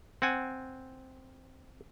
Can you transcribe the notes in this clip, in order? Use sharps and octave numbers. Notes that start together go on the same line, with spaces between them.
C4 F#5 G#5